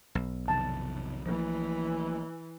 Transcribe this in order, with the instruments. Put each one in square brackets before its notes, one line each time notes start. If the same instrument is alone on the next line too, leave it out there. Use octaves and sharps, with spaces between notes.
[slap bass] B1
[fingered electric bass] F2 C3 D#3 [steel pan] A5
[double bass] E3 [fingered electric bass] F3 A3 A#3